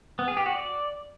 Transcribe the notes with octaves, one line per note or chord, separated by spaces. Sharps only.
B3
G#4
G4
F#4
D5